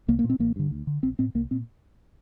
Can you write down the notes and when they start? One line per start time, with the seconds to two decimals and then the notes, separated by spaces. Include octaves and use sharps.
0.08 C2 A#3
0.19 A#3
0.24 A#2
0.30 C4
0.39 A1 A#3
0.56 G2 D3
0.71 D2
0.87 D3
1.03 A#1 C4
1.19 A2 C4
1.35 C2 A#3
1.51 A#2 C4